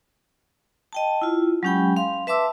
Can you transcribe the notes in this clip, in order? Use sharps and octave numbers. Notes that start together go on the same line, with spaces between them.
D#5 G5 A5
E4 F4
F#3 G#3 C#4 G4 G5 B5
F5 C6
B4 E5 A5 C6 D6 E6